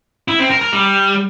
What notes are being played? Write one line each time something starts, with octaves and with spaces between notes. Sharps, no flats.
E4
C4
A#4
A#4
G3